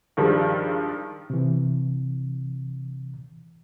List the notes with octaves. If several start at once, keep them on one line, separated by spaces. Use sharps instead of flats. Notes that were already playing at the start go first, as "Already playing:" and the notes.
G2 D#3 F3 G3 G#3
C3 E3